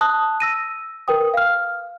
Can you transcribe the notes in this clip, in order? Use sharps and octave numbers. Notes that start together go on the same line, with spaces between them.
A5 D#6 F#6
E6 A#6 D#7
A#4 B4 G5 D#6
F5 F6